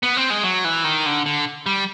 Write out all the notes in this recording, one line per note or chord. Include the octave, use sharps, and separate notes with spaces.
B3
C4
G#3
F#3
E3
D#3
D3
D3
G3